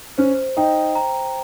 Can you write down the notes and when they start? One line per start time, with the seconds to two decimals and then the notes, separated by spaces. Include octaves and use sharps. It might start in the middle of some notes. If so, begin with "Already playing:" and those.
0.18 C#4 C5
0.57 D#4 G5
0.95 A#5